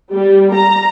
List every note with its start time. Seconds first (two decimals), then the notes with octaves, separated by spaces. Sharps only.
0.12 G3
0.55 A#5